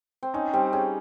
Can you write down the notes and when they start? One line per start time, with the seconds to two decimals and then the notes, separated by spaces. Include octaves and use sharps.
0.23 C4
0.34 C#4 D#4
0.53 G3 C4
0.73 C#4 G#4